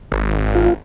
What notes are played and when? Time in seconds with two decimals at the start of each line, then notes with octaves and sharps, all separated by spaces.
0.12 G#1
0.55 F4